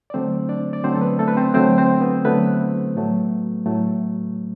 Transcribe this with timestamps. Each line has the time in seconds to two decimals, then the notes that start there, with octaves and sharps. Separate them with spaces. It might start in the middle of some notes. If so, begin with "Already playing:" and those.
0.10 D5
0.14 D3 F#3 A3 C4 C5
0.49 D4 D5
0.73 D5
0.84 D3 F#3 A3 C4 C5
0.95 A4
1.01 B3 B4
1.19 A3 A4
1.28 B4
1.37 C4 C5
1.54 D3 F#3 A3 C4 C5
1.78 C4 C5
2.01 B3 B4
2.25 D3 F#3 A3 B3 B4
2.95 A2 F#3 A3
3.66 A2 F#3 A3